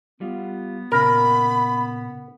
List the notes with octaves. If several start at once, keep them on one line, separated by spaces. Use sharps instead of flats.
G3 B3 F4
A#2 C#3 A#4 B5